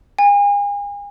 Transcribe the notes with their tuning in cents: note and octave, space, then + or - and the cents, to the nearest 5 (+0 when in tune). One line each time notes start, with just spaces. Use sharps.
G#5 -40